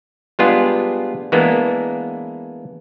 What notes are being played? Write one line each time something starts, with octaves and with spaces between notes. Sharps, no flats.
G3 G#3 B3 D4 F4 G#4
E3 G#3 A#3 B3 D4